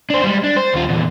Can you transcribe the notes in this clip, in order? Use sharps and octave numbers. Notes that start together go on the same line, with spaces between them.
D4 C5
G3 G#3
D4
C5
D#2 F4
E2 A#2